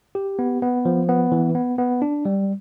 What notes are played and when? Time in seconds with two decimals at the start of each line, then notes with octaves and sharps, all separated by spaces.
0.15 G4
0.39 B3
0.62 B3
0.85 F3
1.09 B3
1.32 E3
1.55 B3
1.78 B3
2.02 D4
2.25 G3